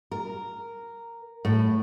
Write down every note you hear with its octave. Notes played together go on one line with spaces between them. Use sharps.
A#4
A2